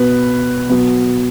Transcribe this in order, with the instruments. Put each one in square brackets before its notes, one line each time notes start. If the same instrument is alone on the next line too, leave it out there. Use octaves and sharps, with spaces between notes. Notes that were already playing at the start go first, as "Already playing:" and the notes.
Already playing: [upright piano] B2 B3 B4
B2 F#3 B3